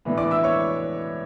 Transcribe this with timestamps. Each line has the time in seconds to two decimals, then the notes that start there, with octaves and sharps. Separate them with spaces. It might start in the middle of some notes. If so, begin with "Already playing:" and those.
0.05 A2 E3 B3 D4
0.18 D5 D6
0.31 E5 E6
0.44 C#5 C#6